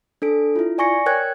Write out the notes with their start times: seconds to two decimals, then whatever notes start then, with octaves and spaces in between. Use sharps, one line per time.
0.22 D4 A4 D7
0.56 E4 F4
0.78 D5 G#5 C#6 A#6 C#7
1.06 A#4 C#5 G5 F#6 G#6